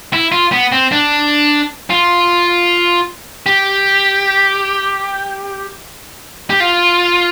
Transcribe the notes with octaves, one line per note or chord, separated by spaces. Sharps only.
E4
F4
B3
C4
D4
F4
G4
G4
F4